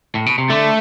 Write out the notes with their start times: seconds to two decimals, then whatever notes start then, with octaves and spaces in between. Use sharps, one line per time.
0.15 A2
0.26 B2
0.38 C3
0.50 D3 A3